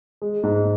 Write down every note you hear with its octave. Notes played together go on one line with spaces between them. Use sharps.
G#3
G#2